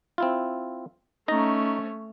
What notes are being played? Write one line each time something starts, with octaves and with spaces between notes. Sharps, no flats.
C4 E4 F4
A3 C#4 D#4 A#5